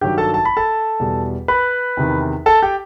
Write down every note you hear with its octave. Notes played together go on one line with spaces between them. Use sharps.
G2 D#3 F#3 G4 G5
A4 A5
A5
B5
A4 A5
E2 B2 G3
B4 B5
E2 C3 D#3
A4 A5
G4 G5